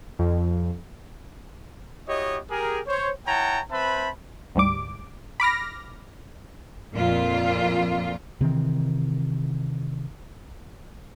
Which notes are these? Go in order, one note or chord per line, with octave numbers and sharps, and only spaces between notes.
F2
E4 F#4 G4 C#5 D#5
G4 G#4 A#4
C5 C#5
E4 C#5 F#5 G5 A5 A#5
C4 B4 C5 E5 A5 B5
D2 G#2 G3 D6
B5 D6 F6 A#6
F2 A#2 F4
C3 D#3 E3 C4